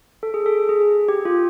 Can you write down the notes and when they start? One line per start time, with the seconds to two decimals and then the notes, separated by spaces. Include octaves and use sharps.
0.23 A4
0.34 G#4
0.46 A4
0.69 G#4
1.09 G4
1.25 F4